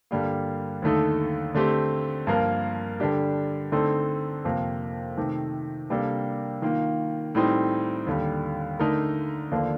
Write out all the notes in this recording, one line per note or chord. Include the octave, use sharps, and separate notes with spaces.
G2 D3 G3 A#3
D#2 D3 A3 D#4 A4
D3 A3 C4 G4
G2 F3 A#3 F4 A#4
D3 G3 D4 G4
D3 A3 C4 D#4 A4
F2 C3 F3 A#3
C3 D#3 A3
C3 G3 A#3 D4 A4
D#3 A#3 F4
A2 G3 C4 D#4
D#2 D3 G3
D3 A3 D#4 A#4
D#2 D3 F3 A#3 D4